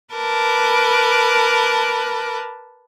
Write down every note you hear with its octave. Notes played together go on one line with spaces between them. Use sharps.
A#4 B4 A5 D6